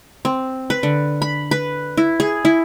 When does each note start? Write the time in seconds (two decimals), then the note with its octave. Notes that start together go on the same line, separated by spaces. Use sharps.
0.25 C4
0.70 B4
0.83 D3
1.22 B5
1.51 B4
1.97 E4
2.20 G#4
2.45 E4